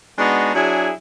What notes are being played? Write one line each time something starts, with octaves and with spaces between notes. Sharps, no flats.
G#3 B3 D4 D#4 F#4
F#3 D4 E4 G#4